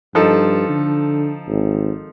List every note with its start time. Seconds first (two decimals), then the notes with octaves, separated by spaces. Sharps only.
0.15 G2 F3 D#4 A4
0.69 D3
1.47 G#1